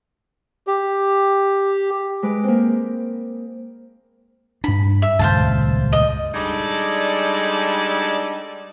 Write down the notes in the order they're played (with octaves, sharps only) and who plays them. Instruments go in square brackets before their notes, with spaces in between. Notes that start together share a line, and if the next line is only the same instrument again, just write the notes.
[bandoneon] G4
[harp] G#3 B4 D6
A#3 C4
[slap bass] G2 D4 [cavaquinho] B5
[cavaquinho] E5
[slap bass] D#1 C#2 G2 [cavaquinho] C5 F5 A5
[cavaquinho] D#5
[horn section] G3 G#3 D4 D#4 A4 D5